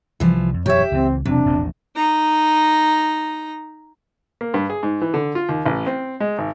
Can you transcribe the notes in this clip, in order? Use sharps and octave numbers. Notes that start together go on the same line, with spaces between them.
C2 E3 F3 G3
F2
E1 F#2 G4 C#5 E5
C#2 E3 C4
E1 C3 F#3 D4
E1 A#1 A2
D#4 A#5
A#3
G2
G#4
G#2
E3
D3
F4
D#2
A1
C4
G#3
G#1